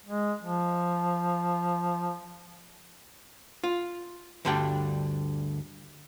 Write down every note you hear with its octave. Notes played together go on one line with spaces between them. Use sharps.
G#3
F3
F4
D2 G2 D3 G3 D4 G5